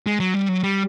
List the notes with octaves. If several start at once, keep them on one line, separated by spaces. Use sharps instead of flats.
G#3
F#3
G3
F#3
G3